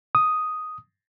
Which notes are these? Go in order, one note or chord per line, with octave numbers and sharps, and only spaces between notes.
D#6